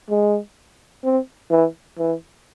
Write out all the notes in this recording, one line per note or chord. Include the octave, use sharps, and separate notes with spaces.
G#3
C4
E3
E3